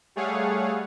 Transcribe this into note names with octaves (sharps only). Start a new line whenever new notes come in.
G3 A3 G#4 C#5 F5 F#5